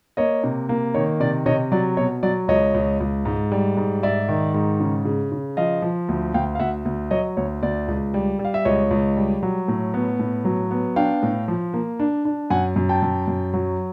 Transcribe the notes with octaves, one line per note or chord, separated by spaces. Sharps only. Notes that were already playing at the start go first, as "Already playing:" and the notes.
A#3 C#5 D#5
C3
A#3
D#3 C#5
C3 D5
C3 C#5 D#5
F#3 D5
B2 C#5
F#3 D5
C#2 C#5 D#5
C#2
C#2
G#2
G3
G#2
G#2 D5 E5
D#3
G#2
C#3
C#3
C#3
F3 D#5 F5
F3
D2
D2 F5 G5
F5
D2 E5 F#5
D2
F#3 C#5 D#5
D2 C#5
D2 D5
C#2
G3
G3
F5
E5
C#2 C#5 D#5
C#2
G3
F#3
A2
B3
A2
F#3
B3
D4 F5 G5
A2
F3
A#3
D4
D4
F#2 F#5 G#5
F#2
G5 A5
F#2
F#2
F#3